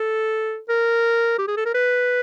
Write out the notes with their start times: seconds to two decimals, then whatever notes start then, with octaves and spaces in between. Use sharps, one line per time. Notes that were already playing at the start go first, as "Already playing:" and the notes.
Already playing: A4
0.69 A#4
1.38 G4
1.48 G#4
1.57 A4
1.66 A#4
1.74 B4